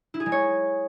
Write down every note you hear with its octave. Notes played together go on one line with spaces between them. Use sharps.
E4
G#4
G#3
C#5